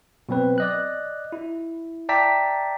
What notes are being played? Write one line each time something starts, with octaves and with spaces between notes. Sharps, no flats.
B2 F#3 C4 B4
D5 D#5 F#6
E4
D5 E5 G5 A5 A#5 B6